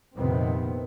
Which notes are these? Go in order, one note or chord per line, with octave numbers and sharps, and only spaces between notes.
A#1 F2 C3 D#3 B3 C4